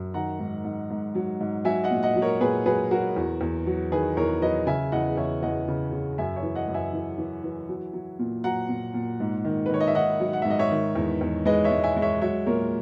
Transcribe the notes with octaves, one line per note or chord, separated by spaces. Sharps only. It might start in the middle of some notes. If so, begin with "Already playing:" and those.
Already playing: F#2
D#3 F#5 A#5
G#2
G#2
G#2
F#3
G#2
F#3 E5 G#5
D#5 F#5
A#2
D#5 F#5
F#3
A#4 C#5
A#2 G#4 B4
F#3 G#4 B4
F#3 F#4 A#4
E2
E2
F#3
D#3 G#4 B4
E2 A#4 C#5
F#3 B4 D#5
C#3 E5 G#5
E2 D#5 F#5
E2 C#5 E5
E2 D#5 F#5
C#3
C#3
F#2 E5 G#5
C#5 E5
E3
D#5 F#5
F#2
E5 G#5
E3
E3
E3
F#3
F#3
A#2
F#3 F#5 A#5
A#2
A#2
G#2
D#3
B4
D#3 C#5
D#5
E5
D#3 D#5 F#5
F#3
F#5
G#2 E5
D#5
C#5 E5
D#3
E2
E2
G#3 B4 D#5
C#5 E5
G#3
E5 G#5
G#3
C#5 E5
F#3 C#5 E5
A#2 A#4 C#5